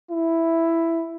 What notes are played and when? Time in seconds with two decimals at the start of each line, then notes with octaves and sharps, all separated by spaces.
0.11 E4